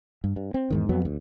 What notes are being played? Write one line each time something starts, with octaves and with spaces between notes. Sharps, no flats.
G2
G2
C4
E2 G#2 D#3
F2 F#3 B3
D2